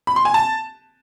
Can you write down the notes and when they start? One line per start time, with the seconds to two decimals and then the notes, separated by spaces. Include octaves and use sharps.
0.07 B5
0.16 C6
0.25 G#5
0.34 A5